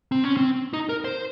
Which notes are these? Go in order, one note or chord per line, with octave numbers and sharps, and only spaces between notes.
C4
C#4
C4
D#4
A#4
C5